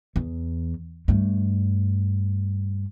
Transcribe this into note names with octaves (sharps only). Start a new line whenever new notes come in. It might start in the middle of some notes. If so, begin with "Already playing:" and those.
E2
G2 A3